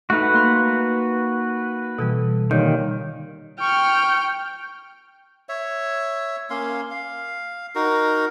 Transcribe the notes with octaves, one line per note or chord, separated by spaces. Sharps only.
A3 D#4 F#4 A4 B4 F6
A#3 C6 F6
B2 E3 G3 A4
A#2 D3 D#3 G3 C#5 G6
G5 C#6 F6
C#5 E5
A#3 C#4 F5 C6
F5
D#4 F#4 A#4